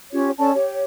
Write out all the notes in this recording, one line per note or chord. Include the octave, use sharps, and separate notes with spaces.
C#4 F4 G4 C#5
C#4 A4 D5 A5
G4 C#5